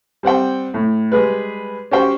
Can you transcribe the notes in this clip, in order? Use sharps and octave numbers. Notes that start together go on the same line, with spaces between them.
G3 C4 F#5 G5
A2
G3 G#3 G#4 B4
C#4 F#4 G4 C5 G5